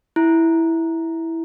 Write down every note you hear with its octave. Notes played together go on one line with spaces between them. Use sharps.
E4